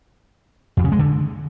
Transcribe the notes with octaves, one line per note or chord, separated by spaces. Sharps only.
F2
C#3
G#3
D3